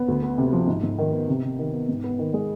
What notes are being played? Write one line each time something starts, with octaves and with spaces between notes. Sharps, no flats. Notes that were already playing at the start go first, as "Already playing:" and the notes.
Already playing: B3
D2
B3
C3
F3
G#2
G#2
D#3
B3
C3
C3
D#3
B3
G#2
B3
D#3
G#3